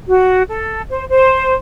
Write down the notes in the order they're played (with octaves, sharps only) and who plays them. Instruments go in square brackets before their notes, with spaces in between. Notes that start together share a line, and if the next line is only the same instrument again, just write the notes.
[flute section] F#4
A4
C5
C5